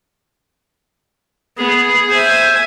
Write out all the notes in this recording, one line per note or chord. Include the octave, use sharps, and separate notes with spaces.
B3 G#4
C5 E5 G#5